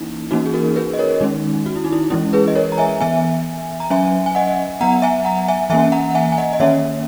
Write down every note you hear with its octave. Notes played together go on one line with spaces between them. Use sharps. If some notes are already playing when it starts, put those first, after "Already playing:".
Already playing: E3 A#3 C#4 D#4 E4
E3 A#3 C#4 D#4 F#4
G#4
F#4 A#4
G#4 B4
D#5
A#4 C#5
D#3 G#3 C#4 D#4
F#4
E4
D#4
E4
E3 G#3 C#4 E4
G#4 B4
D#5
A#4 C#5
A#5
E5 G#5
E3 B3 E5 G#5
A#5
F#3 C#4 E5 G#5
G#5
D#5 F#5
F#3 B3 F#5 A#5
E5 G#5
F#5 A#5
E5 G#5
E3 A#3 C#4 E5 G#5
F#5 A#5
F#5
E5 G#5
G#5
D#5 F#5
D#5
D#3 A#3 C#4 C#5 E5